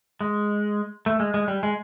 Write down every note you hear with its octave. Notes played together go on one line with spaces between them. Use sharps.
G#3
A3
G#3
G#3
G3
G#3